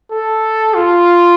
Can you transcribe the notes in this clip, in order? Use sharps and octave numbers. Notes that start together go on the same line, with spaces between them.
A4
F4